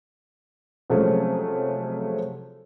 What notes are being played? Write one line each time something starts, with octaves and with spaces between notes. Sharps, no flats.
C3 F3 F#3 G#3 A3 C#4